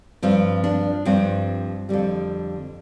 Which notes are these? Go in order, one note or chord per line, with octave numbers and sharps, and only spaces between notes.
G2 F3 C4
D4
G2 F3 C4
F2 D3 G3